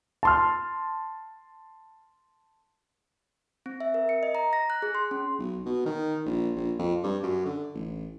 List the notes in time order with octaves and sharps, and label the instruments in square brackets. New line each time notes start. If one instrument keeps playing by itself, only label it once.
[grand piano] A5 C6 F6
[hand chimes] C4
E5
A#4
C#7
D#5
A#5
A#6
F#6
G#4
C6
C#4
[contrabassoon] B1
B2
D#3
A#1
A#1
F2
G2
F#2
D3
A1